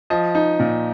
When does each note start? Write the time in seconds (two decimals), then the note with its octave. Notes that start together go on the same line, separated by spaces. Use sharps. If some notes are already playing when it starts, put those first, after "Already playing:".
0.10 F3 D#5
0.35 D#4
0.60 A#2